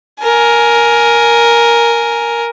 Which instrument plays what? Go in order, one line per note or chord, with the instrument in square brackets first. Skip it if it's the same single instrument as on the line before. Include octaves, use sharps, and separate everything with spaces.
[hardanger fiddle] A#4 G#5